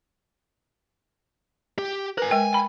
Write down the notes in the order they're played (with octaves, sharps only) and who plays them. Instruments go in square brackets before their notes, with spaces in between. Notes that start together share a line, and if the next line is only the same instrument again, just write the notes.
[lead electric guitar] G4
[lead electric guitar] A#4 G#5 [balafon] B4
[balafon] G#3 A#4 G5 [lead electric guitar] G#5
[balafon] G5 B5